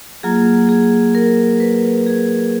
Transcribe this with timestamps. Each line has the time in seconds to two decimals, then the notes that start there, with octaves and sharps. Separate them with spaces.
0.23 F#3 A#3 F4 G#4
0.69 G#4
1.15 A#4
1.60 B4
2.06 G#4